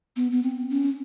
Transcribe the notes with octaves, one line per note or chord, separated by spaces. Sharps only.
B3
B3
C4
C#4